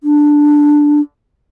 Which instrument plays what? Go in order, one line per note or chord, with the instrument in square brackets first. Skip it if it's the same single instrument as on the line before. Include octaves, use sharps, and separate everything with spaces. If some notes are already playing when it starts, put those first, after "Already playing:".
[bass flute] D4